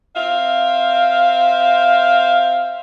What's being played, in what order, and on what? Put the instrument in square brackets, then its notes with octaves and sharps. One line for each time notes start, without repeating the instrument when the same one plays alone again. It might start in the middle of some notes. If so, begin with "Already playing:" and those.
[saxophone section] C4 E5 F5